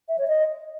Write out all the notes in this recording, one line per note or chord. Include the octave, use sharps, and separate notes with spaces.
E5
C#5
D#5